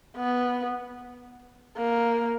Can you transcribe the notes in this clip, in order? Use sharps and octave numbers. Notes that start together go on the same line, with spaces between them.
B3
A#3